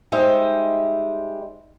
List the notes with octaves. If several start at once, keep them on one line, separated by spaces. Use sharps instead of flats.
G3 G#3 D#4 C5 E5